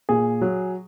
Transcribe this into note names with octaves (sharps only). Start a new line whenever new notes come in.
A#2 G#4
F#3